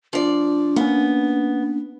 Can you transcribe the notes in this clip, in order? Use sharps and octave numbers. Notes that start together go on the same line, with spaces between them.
F3 D4 D5
A#3 B3 C#4